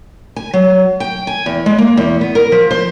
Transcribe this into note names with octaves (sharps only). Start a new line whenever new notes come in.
G#5
F#3
G5
G#5
E2
G#3
A#3
E2
B3
A#4
F3
C5